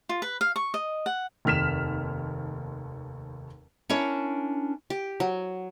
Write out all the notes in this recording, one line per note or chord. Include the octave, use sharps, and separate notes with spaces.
F4
B4
F5
C#6
D#5
F#5
F1 D#2 F6 B6 E7
C#4 D4 E4 A#4 C#5
G4
F#3